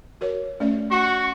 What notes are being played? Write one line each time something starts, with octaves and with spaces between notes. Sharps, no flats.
F#4 A#4 C#5
A3 C#4 D5
F#4 C#6